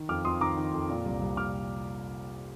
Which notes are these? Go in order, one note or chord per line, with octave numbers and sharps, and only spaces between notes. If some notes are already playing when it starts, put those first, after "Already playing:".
Already playing: D#3
F2 D6 F6
F2 C6 D#6
D#3 A#5 D6
D#3
F2
A#2
C2
C2
A#2 D6 F6